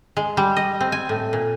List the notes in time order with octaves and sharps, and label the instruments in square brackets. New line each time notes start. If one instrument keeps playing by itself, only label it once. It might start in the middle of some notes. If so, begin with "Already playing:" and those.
[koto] G#3
G3
D#5
C4
G#5
A2
A#2